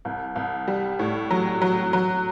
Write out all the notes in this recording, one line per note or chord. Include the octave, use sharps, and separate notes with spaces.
C2
C2
G3
A2
F#3
F#3
F#3